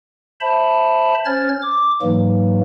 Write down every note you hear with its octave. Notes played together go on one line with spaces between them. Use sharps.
C5 E5 A5 B5
C#4 C5 C#5 F6 A6
D6
G#2 E3 F#3 A#3